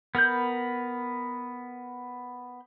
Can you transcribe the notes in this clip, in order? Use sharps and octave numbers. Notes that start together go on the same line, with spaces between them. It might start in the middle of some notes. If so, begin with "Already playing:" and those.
B3 A#4 B5 G6